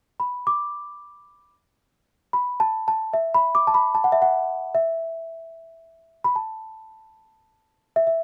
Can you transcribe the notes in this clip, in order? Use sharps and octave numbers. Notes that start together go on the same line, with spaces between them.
B5
D6
B5
A5
A5
E5
B5
D6
A5
B5
A5
F#5
E5
F#5
E5
B5
A5
E5
E5